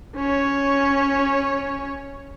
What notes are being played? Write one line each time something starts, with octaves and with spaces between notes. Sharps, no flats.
C#4 C#5